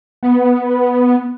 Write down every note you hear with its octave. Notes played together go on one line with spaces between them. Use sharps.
B3